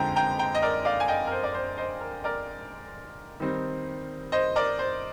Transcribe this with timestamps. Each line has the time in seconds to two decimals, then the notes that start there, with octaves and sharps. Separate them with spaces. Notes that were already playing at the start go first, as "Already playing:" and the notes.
Already playing: F2 D3 F3 G#3 C4 G5 A#5
0.16 G5 A#5
0.39 G5 A#5
0.55 D#5
0.62 A#4 D5
0.85 D5 F5
1.00 G#5
1.08 D#5 G5
1.27 A#4
1.31 C5
1.44 D5
1.54 C5
1.77 C5 D#5
2.01 A#4
2.24 A#4 D5
3.40 D#3 G3 C4 D#4
4.32 C5 D#5
4.56 A#4 D5
4.79 C5